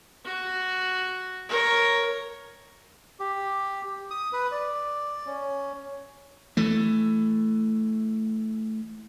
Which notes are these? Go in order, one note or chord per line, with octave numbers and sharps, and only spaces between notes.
F#4
A#4 C#5
G4
D#6
B4
D5
C#4
E3 A3